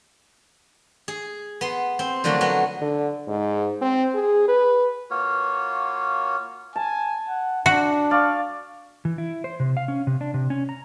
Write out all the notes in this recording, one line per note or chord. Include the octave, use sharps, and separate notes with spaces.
G#4
B3 C6
C4
D3 F3 F#3 A3 A#3 D4
F#3 B3
D3
G#2
C4
G#4
B4
A#3 F4 F#4 C#5
G#5 A5
F#5
D4 F#4
D5 F5 C#6
E3
E4
C5
C3
F5
C#4
C3
D4
C3
C#4
A#5